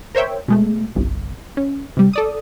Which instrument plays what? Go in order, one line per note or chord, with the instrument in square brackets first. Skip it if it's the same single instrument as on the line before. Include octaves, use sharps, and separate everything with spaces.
[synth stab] A#4 C5 C#5 E5 G5
B2 G#3 A3
G1 C2
C#4
C3 G3
A4 D5 D#6